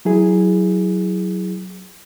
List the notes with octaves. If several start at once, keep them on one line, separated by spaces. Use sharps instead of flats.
F#3 E4 G#4